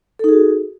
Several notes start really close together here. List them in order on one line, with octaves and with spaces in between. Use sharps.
A4 D#4 G#4 F#4